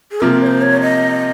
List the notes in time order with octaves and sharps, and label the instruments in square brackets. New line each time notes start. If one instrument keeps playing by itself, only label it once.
[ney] G#4
[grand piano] C3 F3 A#3 [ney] A#4
[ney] C#5
C5
C#5
D#5